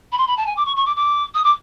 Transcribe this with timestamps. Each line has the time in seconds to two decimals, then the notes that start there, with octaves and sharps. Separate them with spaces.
0.12 B5
0.18 C6
0.28 B5
0.37 A5
0.47 G#5
0.57 D6
0.66 C#6
0.76 C#6
0.86 D6
0.96 D6
1.34 D#6
1.44 D6